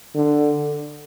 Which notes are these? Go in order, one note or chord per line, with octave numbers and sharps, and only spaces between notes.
D3